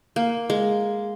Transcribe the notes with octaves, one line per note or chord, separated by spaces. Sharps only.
A#3
G#3